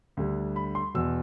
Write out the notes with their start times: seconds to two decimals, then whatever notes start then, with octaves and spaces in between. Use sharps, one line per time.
0.17 D2 D3 G3
0.56 B5
0.75 C6
0.94 E2 B2 E6